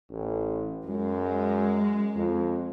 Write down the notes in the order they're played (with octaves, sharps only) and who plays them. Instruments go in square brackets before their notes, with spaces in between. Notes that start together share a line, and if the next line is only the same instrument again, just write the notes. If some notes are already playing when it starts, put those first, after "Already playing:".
[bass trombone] A1
[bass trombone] F#2 [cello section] G#3
[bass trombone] F2